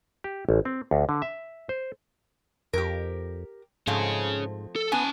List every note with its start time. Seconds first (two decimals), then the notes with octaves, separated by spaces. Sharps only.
0.24 G4
0.49 A1
0.65 C4
0.91 D2
1.09 D3
1.22 E5
1.69 C5
2.73 F2 G4 A#4
3.87 G#2 F3 A3 C4 C#4 G#4
4.76 A4
4.92 B3 C#4 G#5 A5